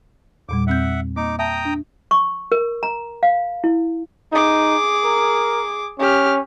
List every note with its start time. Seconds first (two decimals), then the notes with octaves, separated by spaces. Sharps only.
0.49 E2 A#2 G3 D6
0.67 E2 C4 E5 F#5 G6
1.16 A#3 D#4 D6
1.39 E5 G5 A5 A#5 D#6
1.65 D4
2.11 C#6
2.52 A#4
2.83 A#5
3.23 F5
3.64 E4
4.33 D#4 G#4 D6
5.05 A#4
5.99 C#4 G4 F6